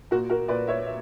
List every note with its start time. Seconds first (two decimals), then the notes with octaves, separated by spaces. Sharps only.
0.11 A#2 F#4 A#4
0.30 F#4 A#4
0.48 A#2 B4 D5
0.68 C#5 E5
0.86 E5